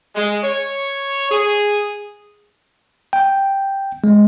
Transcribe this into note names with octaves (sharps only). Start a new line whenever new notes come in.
G#3
C#5
G#4
G5
G#3